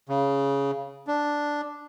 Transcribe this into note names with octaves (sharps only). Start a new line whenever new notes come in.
C#3
D4